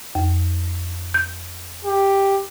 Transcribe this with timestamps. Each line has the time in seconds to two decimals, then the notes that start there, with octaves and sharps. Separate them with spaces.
0.15 F2
1.14 G6
1.85 G4